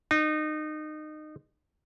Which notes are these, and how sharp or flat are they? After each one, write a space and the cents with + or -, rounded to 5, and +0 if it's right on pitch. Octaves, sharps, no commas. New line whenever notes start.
D#4 -25